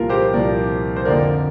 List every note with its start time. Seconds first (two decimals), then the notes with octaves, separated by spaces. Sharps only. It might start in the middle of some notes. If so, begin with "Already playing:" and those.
Already playing: C2 A#2 F3 F4 A#4
0.09 G4 C5
0.33 C2 A#2 F3 A#4 D5
0.96 C5
1.05 F2 D3 A#3 A#4 D5